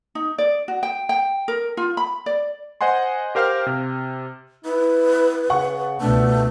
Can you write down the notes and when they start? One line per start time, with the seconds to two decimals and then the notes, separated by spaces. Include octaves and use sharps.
0.15 D#4
0.38 D5
0.68 F#4
0.83 G5
1.09 G5
1.48 A#4
1.77 F4
1.97 B5
2.26 D5
2.81 C5 D#5 F#5 G#5 C6
3.35 G4 A#4 C5 F5 G5 F6
3.66 C3
4.65 E4 B4
5.50 C#3 F#5 C#6
6.01 C#2 B2 A3 D4